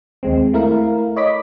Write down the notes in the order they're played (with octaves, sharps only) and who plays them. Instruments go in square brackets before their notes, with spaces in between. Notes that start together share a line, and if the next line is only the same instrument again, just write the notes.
[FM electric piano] D#2 G#3 C4
A3 E4 A#4 F5
C#5 D#5 B5 D6 B6